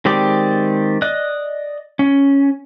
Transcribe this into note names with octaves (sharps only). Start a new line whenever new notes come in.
D#3 G#3 C4 G4 D5
D5 D#5 F#6
C#4